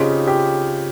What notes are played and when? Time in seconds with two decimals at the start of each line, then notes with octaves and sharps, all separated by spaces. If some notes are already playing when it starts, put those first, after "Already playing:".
Already playing: C#3 C4 D#4 F4 G4
0.27 G4